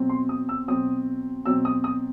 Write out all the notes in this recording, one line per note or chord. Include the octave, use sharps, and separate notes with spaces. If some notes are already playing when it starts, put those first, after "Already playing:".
Already playing: B2 F#3 C4
C6
D#6
E6
B2 F#3 C4 D#6
B2 F#3 C4 E6
D#6
D#6